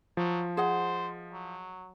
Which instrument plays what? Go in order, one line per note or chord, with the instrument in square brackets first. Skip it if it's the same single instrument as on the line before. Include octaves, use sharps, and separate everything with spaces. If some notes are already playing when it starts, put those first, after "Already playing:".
[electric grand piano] F3 [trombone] F#3
[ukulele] G#4 D#5 F#5 [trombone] C5
[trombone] F#3